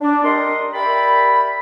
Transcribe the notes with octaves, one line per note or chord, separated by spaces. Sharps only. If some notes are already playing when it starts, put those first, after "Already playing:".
D4
G3 A#4 D#5 C6
G4 A#4 D5 E5 B5